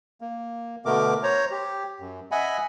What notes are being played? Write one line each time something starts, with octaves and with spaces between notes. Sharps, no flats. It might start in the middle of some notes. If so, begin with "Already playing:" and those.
A#3
B2 D3 A3 B3 A#4 D6
C5 C#5 A#5
G4
F#2
D#5 E5 F#5 G#5 B5